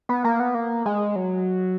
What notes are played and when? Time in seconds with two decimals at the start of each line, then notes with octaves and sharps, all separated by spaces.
0.09 B3
0.24 A#3
0.40 B3
0.55 A#3
0.86 G#3
1.16 F#3